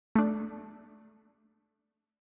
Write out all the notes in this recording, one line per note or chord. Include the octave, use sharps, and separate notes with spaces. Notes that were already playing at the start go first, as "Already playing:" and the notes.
A3 D4